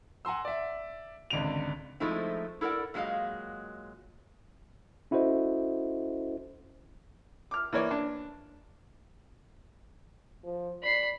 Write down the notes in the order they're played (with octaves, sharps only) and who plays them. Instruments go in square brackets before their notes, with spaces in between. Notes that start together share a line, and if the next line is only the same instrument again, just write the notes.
[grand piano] F#5 G#5 A#5 C6 E6
D5 E5
G#1 C#2 D3 D7 F7
[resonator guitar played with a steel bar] F3 G#3 A3 C4 D#4 E4
E4 A4 A#4 D5 F#5
A#2 F#3 G#3 D#5 F5
[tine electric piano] C#4 E4 F#4 A4 C5 D#5
[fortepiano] D6 F6
E3 A#3 C#5 D5
D4
[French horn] F3
[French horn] D5 [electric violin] B5 C7